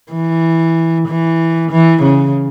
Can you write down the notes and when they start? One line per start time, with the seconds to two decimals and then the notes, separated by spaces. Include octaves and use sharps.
0.12 E3
1.08 E3
1.71 E3
2.03 C#3